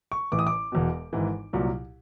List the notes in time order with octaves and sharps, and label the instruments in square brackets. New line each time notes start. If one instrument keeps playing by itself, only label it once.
[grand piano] C#6
A1 A2 E3 D6
D#6
D6
E1 E2 B2
G#1 G#2 E3
C2 A#2 F#3